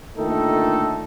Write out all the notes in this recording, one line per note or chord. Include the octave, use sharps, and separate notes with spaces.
A#2 D3 D#3 A3 D#4 A4